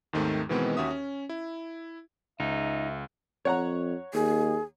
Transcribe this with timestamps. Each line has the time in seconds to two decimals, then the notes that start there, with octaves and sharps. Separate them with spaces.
0.13 D#2 G#2 D#3 A3 C4
0.49 B2 D#3 E3 G#3 B3 C4
0.77 D#2 C#4 F#4 E5 D#6
0.90 C#4
1.29 E4
2.40 C#2 D#4 E5
3.45 F2 C#5 F#5 A#5
4.13 D#2 G#4